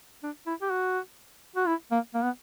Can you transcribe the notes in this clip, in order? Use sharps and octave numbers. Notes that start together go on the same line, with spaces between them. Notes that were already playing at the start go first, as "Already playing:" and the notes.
D4
E4
G4
F#4
F#4
E4
A#3
A#3
B3